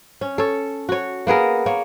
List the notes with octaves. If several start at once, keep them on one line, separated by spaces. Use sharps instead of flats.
C#4
A4 C#5
F#4 C#5
A#3 B3 G#4 A#4
A#3 C#5